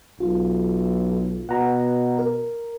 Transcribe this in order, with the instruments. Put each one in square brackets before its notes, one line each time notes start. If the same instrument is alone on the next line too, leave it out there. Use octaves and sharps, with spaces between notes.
[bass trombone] B1 [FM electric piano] F4
[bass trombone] B2 [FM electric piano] F#5 A#5
[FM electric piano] A#4